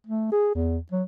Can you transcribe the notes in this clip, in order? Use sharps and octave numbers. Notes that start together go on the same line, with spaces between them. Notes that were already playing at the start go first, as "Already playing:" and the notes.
A3
G#4
E2
F#3